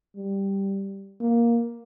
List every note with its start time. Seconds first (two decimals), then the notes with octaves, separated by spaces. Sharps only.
0.17 G3
1.21 A#3